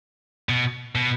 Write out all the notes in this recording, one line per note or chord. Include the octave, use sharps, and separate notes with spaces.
B2
B2